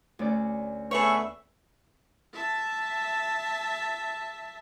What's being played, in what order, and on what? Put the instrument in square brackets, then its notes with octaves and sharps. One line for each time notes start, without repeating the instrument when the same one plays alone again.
[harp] D2 C#4 D5
[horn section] A3 B3 E5 [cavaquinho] G#4 B4 C#5 [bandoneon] C#6
[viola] E5 A5